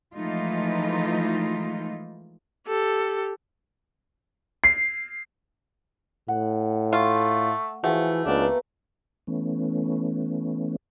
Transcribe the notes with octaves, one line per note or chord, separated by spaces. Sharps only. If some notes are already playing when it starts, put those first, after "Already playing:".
E3 F3 G#3 A3 D#4 F4
G4 A4
C7
A2 F#5
A3 F4
E3 F3 A3 F#4 G#4
C#2 A#3 B3 D4
E3 A3 B3 C#4